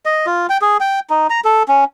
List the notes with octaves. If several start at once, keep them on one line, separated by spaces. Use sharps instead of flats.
D#5
F4
G5
G#4
G5
D#4
A#5
A4
C#4